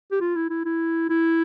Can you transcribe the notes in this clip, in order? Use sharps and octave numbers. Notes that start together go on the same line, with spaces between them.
G4
F4
E4
E4
E4
E4